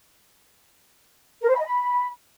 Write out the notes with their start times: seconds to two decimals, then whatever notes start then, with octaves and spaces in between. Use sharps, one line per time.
1.42 A#4
1.47 C5
1.53 B5
1.59 D#5
1.64 B5